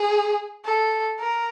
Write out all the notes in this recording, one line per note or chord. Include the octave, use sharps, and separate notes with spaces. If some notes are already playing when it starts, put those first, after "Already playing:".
Already playing: G#4
A4
A#4